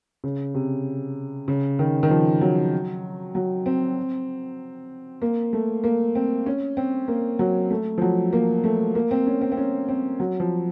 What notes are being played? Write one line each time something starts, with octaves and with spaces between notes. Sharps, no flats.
C#3
C3
C#3
D#3
D#3
F3
F#3
F#3
C4
A#3
A3
A#3
C4
C#4
C4
A#3
F#3
A3
F3
F#3
A#3
A3
A#3
C4
C#4
C4
C4
C#4
C4
F#3
F3